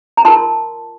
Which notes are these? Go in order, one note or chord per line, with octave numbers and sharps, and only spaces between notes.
A#5
F4 A#4 A5 C6